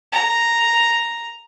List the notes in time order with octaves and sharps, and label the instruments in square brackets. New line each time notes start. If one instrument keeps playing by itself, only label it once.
[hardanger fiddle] A#5